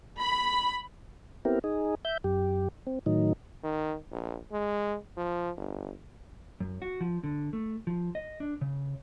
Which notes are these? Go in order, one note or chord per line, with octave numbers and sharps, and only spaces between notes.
B5
B3 C4 E4 G4 A#4
D#4 G#4
E5 G6
F#2 G4
C4
A2 D#3 F#3 D#4
D#3
A#1
G#3
F3
G1
F#2
F#4
F3
D3
A3
F3
D#5
D4
C#3